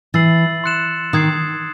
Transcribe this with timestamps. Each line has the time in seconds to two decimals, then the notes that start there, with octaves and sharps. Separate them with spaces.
0.14 E3 E6 A6 C7 F#7
0.64 C6 F#6 C#7 E7
1.13 D#3 D#6 G#6 C7